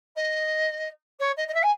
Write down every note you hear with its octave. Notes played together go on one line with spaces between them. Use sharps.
D#5
C#5
D#5
D#5
E5
G#5